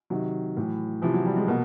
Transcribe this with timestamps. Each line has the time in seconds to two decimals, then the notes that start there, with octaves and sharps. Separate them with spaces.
0.10 C3 D#3 F#3
0.57 A2 E3
1.02 C3 E3 F3
1.14 F#3
1.26 G3
1.37 G#3
1.48 B2 A#3